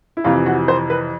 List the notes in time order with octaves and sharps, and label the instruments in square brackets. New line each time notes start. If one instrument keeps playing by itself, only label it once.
[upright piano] E4
F2 C3 E3 F4
F#4
C5
B4